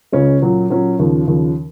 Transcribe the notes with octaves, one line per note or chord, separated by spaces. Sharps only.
C#2 C#3 G#3 C#4
A#2 F#3 C#4
A#2 F#3 C#4
D#2 C#3 F3
D#2 C#3 F3